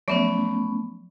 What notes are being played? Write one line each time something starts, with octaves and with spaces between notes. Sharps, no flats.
F3 F#3 A3 B3 C#4 E5